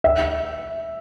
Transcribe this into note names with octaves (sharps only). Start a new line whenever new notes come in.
E5